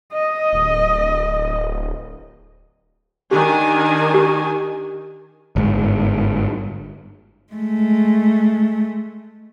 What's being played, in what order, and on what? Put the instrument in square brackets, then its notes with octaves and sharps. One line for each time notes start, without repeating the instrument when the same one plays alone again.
[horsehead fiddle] D#5
[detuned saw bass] D1
[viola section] D#3 D4 G#5 [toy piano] G4
[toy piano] G4
[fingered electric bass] G1 G#2
[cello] G#3 A3